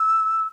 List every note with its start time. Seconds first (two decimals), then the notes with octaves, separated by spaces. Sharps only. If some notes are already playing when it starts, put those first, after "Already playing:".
Already playing: E6